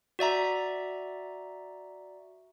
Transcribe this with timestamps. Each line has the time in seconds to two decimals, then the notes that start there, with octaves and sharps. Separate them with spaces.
0.19 F#4 D5 E5 A#5